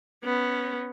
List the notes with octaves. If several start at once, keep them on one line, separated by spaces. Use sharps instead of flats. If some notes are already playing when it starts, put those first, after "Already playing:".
B3 C#4